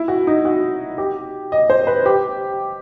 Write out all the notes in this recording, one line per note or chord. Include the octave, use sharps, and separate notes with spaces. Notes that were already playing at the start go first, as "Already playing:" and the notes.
Already playing: E4
F#4
D#4
F#4
G4
D#5
C5
B4
G4